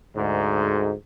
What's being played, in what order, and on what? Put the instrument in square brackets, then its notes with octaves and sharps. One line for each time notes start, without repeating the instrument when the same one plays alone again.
[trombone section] D2 G#2